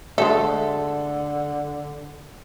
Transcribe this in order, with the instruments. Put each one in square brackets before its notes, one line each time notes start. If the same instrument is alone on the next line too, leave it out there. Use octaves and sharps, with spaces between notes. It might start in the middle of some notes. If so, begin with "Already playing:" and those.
[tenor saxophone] D3 [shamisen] G#3 A3 E5 [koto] A4